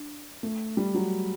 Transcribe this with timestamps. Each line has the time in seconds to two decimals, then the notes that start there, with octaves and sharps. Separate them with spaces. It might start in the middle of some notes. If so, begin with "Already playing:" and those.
Already playing: D4
0.43 A3
0.77 G3
0.94 F#3